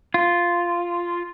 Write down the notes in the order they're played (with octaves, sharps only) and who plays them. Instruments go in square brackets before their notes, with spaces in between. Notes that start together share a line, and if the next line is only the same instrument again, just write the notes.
[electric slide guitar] F4